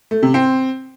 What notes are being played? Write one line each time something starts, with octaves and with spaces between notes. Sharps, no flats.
A3
C3
C4